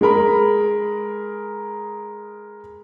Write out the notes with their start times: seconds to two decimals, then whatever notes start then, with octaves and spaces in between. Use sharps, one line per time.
0.01 G#3 G#4 A#4 B5